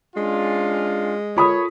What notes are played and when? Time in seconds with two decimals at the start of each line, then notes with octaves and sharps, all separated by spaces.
0.17 G#3 C#4 D4 F4
1.36 F4 A4 A#4 C#5 B5 D#6